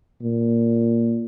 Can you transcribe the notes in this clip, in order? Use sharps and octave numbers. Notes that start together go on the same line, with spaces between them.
A#2